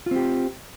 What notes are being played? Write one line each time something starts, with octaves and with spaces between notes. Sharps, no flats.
C4 F4 G4